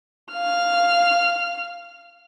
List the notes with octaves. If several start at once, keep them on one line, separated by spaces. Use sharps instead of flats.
F5 F6